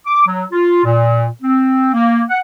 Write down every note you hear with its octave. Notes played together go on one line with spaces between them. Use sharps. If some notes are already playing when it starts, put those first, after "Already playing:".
D6
F#3
F4
A#2
C4
A#3
F#5